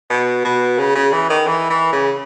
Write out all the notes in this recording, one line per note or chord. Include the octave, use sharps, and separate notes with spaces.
B2
B2
C#3
C#3
E3
D#3
E3
E3
C#3